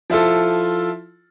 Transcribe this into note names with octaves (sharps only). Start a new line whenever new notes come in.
F3 E4 F4 A4